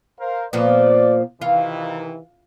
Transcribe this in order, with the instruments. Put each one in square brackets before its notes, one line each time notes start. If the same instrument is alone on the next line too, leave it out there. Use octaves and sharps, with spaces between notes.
[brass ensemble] A#4 C5 F5
[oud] A#2 F3 B3 [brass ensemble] D5
[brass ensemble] C3 D#3 E3 [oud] F4